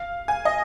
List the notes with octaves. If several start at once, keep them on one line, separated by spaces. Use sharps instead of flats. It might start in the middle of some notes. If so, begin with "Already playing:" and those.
Already playing: F5
G#5
D#5